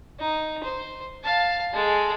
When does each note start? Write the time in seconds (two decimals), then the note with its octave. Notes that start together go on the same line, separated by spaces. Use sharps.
0.19 D#4
0.64 C5
1.24 F5 A5
1.73 G#3 A4